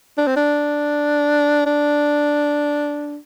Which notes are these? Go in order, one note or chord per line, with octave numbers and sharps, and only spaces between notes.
D4
C4
D4
D4